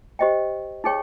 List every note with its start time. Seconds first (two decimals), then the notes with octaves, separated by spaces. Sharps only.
0.19 G4 C5 D#5 G5
0.84 D#4 G#4 C#5 G5 C#6